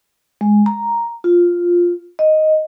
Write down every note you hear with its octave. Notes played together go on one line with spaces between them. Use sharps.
G#3
A#5
F4
D#5